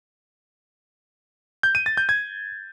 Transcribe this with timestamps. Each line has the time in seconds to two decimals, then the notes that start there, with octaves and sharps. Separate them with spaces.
1.63 G6
1.75 D#7
1.86 A6
1.97 G6
2.09 G#6